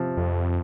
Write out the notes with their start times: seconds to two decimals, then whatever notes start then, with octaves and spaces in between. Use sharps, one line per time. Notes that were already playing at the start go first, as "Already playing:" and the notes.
Already playing: C3 F3
0.17 F2